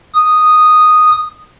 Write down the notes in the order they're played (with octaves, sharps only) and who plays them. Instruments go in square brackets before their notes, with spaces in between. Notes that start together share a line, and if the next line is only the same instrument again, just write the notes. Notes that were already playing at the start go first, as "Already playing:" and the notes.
[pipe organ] D#6